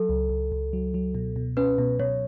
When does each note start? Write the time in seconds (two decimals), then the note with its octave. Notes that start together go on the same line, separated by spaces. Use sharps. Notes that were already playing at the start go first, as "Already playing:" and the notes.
Already playing: F#3 A4
0.09 C#2
0.30 C#2
0.52 C#2
0.73 F#3
0.94 F#3
1.15 B2
1.36 B2
1.57 C#4 B4
1.78 B2
2.00 B2 C#5